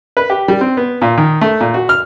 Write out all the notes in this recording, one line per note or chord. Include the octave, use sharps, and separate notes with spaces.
B4
G4
G3
C4
B3
A#2
D#3
A3
A#2
F#4
F6